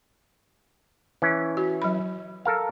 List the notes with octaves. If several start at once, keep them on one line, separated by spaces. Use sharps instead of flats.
E3 C#4
F#4
F#3 B5
A4 A#4 F5